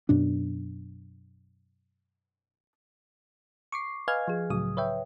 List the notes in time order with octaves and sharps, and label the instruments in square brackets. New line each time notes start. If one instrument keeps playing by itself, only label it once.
[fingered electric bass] F#2 B2 D4
[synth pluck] C#6 D6 C7
B4 D#5 F5 G#5 F6 G#6
F3 G#4
C#2 A2 C#3 F#3 D#6
B4 C#5 E5 G5